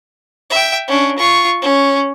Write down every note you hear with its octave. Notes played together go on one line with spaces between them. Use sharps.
E5 G5
C#4 D4
F4 C#6
C#4